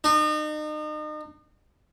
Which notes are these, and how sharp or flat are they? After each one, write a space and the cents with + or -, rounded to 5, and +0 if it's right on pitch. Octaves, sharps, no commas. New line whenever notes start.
D#4 -35